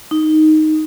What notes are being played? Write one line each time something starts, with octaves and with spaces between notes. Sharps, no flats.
D#4